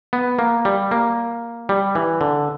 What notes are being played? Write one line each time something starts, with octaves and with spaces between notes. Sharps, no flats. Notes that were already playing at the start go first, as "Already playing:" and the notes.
B3
A#3
G3
A#3
G3
E3
D3